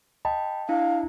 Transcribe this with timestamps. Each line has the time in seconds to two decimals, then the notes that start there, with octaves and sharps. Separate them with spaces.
0.25 D#5 G5 A5 B5
0.69 D4 E4 F5